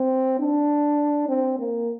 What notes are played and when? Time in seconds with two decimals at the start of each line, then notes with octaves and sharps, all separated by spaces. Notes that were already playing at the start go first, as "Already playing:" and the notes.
Already playing: C4
0.39 D4
1.29 C4
1.59 A#3